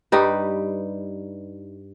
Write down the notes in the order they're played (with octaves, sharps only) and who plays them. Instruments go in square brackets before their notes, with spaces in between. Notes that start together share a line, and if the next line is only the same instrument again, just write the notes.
[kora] G2 G3 D#4 B4